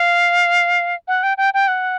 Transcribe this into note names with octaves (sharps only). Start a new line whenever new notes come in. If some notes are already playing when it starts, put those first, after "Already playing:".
Already playing: F5
F#5
G5
G5
G5
F#5